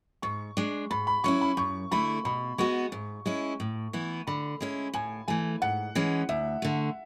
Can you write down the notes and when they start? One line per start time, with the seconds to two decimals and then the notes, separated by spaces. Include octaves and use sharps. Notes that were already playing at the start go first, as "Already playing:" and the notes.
0.22 G#2 C#6
0.57 G#3 D4
0.91 G#2 B5
1.07 B5
1.24 F#3 C#4 E4 C#6
1.41 B5
1.57 F#2 C#6
1.91 D3 A3 E4 B5
2.25 B2 B5
2.58 G#3 B3 F#4 C#6
2.92 G#2
3.26 G#3 C#4 E4
3.60 A2
3.93 E3 B3 E4
4.27 D3 B5
4.61 G#3 C#4 E4
4.93 A2 G#5
5.28 E3 A3 G#5
5.62 G#2 F#5
5.95 E3 G#3 C#4
6.29 D2 E5
6.62 D3 A3